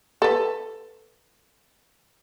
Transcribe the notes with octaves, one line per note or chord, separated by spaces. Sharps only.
A4 B4